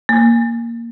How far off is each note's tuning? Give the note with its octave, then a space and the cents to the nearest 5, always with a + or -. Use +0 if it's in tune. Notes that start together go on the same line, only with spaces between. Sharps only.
A#3 +0